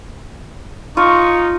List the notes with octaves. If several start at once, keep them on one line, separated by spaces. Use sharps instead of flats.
D#4 F4 C#6